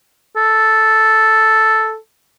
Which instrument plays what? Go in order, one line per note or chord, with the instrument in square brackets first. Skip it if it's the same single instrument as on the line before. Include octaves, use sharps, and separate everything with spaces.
[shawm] A4